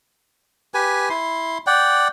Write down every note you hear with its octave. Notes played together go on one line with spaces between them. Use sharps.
G4 B4 G#5
E4 C6
D5 F#5 G5